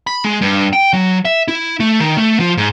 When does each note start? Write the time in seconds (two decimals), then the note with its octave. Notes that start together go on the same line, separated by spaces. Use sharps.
0.07 B5
0.24 G#3
0.42 G2
0.73 G5
0.93 F#3
1.25 E5
1.48 E4
1.80 A3
2.00 D#3
2.17 A3
2.40 F3
2.57 G#2